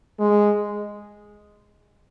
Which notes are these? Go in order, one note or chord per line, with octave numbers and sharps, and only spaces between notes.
G#3